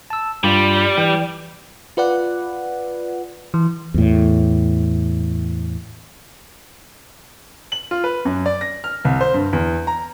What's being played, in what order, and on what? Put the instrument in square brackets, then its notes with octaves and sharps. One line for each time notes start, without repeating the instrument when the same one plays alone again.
[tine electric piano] A5 E6
[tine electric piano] G2 F4 [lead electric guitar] G3
[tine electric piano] E3 G5
[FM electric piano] F4 B4 D5 F#5
E3
[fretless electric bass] E2 A2
[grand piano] F#7
F4
B4
F#2
D5
A#6
F6
C2
C5
G2
E2
A#5